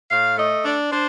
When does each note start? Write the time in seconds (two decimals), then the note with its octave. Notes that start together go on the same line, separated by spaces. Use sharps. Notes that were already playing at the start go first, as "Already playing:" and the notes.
0.11 A2 F5
0.37 A3 D#5
0.65 D4 D5
0.91 D4 C5